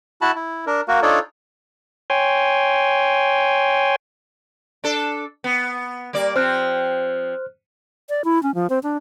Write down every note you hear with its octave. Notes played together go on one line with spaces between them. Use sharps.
E4 F#4 A5 B5
E4
D4 A#4
A#3 F#4 A#4
D4 D#4 F4 A4 C#5 D5
C#5 G5 G#5 C6
D4 A4
B3
G3 A#3 D5
F3 C4 C5 F6 F#6
D5
E4
C#4
F3
C4
D4